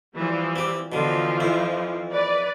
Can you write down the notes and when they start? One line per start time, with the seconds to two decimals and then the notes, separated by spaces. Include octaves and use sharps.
0.16 E3 F3 G3
0.56 C4 G4
0.92 B2 D3 E3 F3 F4
1.40 F2 E4
2.11 B4 D5